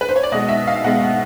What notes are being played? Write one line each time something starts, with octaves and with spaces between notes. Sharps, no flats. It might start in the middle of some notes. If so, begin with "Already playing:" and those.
B4
C5
C#5
D5
B2 G#3 B3 D#5
E5
F5
B2 G#3 B3 F#5